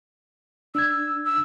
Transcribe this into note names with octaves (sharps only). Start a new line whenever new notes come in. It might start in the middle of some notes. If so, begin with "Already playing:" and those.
D4 E6 G#6
E6